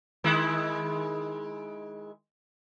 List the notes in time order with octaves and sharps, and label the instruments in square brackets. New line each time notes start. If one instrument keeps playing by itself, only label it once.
[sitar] D#3 G#3 E4